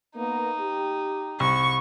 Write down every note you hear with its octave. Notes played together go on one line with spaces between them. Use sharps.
A#3 B3 D#4
G4
C2 C#6